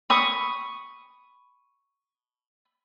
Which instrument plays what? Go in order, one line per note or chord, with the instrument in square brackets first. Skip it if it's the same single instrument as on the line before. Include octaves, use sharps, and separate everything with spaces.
[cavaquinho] B5 C#6 D#6